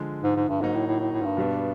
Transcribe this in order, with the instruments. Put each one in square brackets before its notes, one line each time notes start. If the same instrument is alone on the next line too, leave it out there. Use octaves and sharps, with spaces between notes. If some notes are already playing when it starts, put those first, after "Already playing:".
Already playing: [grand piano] D3 F3 G#3
[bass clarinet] G#2
G#2
G2
[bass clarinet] G#2 [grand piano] F#3 A#3 D#4 F#4
[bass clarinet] A2
A2
A2
A2
G#2
G2
[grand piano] B2 G3 B3 D4